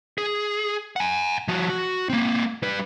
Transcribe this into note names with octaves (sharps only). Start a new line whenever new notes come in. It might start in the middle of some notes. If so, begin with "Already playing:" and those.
G#4
F#5 G#5
F3 F#4
F#4
A#3 C4
G3 B4